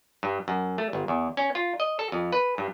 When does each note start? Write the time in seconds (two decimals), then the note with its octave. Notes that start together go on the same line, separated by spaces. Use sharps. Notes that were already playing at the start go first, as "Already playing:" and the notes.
0.23 G2
0.48 F#2
0.78 A3
0.93 G1
1.08 E2
1.37 C#4
1.55 F4
1.80 D#5
1.99 A4
2.12 F2
2.33 B4
2.58 G2